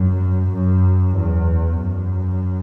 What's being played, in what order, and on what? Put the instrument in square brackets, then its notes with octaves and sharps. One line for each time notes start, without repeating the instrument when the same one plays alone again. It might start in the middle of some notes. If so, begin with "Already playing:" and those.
Already playing: [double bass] F#2
F#2
E2
F#2